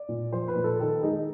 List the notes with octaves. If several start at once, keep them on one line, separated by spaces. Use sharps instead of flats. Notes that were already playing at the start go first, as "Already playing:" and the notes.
Already playing: D5
A#2
F3 C5
B4
A#2
A4
D#3 A4
G#3 D#4